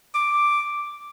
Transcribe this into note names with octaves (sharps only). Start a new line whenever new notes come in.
D6